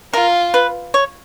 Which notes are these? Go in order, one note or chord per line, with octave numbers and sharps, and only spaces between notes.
F4 A#4
B4
C#5